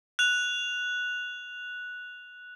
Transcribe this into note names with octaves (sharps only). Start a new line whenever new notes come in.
F#6 F7